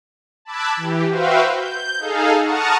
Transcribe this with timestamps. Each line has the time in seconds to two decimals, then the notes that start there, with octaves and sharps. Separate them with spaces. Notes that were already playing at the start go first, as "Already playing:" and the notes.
0.45 A5 B5 D6 E6 F#6 G#6
0.77 E3 G4
1.09 F#4 B4 C5 E5 F5 G5
1.50 G6
1.99 D#4 G#4 A4 F5
2.41 F#5 A5 A#5 C#6 D#6 F6